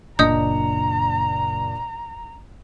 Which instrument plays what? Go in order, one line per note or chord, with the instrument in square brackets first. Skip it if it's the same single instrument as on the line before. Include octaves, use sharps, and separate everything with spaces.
[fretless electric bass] F#1 [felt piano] A#2 D4 C#7 [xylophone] D#5 D#6 G6 [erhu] A#5